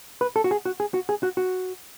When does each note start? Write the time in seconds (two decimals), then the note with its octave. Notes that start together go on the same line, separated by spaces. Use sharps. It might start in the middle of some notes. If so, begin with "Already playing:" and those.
0.21 B4
0.36 A4
0.44 F#4
0.51 G#4
0.65 F#4
0.80 G#4
0.94 F#4
1.09 G#4
1.23 F#4
1.37 F#4